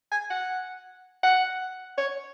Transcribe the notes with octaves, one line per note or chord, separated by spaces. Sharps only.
G#5
F#5
F#5
C#5